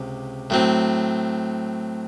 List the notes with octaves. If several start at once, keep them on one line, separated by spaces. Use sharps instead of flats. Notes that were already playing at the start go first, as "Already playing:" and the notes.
Already playing: C#2 C3
A2 F#3 C4